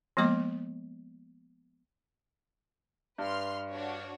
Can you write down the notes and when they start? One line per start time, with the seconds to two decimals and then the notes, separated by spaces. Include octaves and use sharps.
0.17 F3 G#3 A#3 B3 D#5 D6
3.18 G2 B4 C6 F6
3.70 D4 F#4 C#5